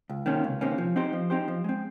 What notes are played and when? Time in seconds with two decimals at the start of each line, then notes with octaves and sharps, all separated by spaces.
0.09 C#2
0.26 C3 D#3 A#3 C#4
0.44 C#2
0.61 C3 D#3 A#3 C#4
0.78 F3
0.96 C4 D#4 G4 C5
1.13 F3
1.30 C4 D#4 G4 C5
1.48 F3
1.64 G#3 C4